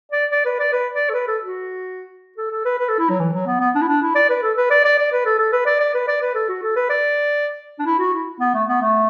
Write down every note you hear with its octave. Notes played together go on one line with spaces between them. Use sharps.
D5
D5
B4
D5
B4
D5
A4
B4
A4
F#4
A4
A4
B4
B4
A4
E4
F#3
E3
F#3
B3
B3
D4
E4
D4
E4
D5
B4
A4
B4
D5
D5
D5
B4
A4
A4
B4
D5
D5
B4
D5
B4
A4
F#4
A4
B4
D5
D4
E4
F#4
E4
B3
A3
B3
A3